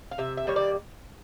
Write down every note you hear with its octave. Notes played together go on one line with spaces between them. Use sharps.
F5
C3 E5
E5
D#3 G3 A#3 C#5
D5